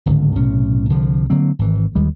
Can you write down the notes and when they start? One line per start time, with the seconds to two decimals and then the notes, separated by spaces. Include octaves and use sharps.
0.06 D1 G#1 C#2 D3
0.35 B1 A2 C3 C#4
0.90 C2 D3 F3
1.30 D3 F#3 A#3 C4
1.59 G#1 E3
1.95 D#2 D#3 G3 G#3